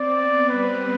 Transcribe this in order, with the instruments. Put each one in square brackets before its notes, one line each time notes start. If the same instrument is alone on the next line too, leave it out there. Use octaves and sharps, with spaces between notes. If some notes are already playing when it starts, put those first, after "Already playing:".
Already playing: [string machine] C4 [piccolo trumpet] D5
[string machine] B3
[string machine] G3 [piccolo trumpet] B4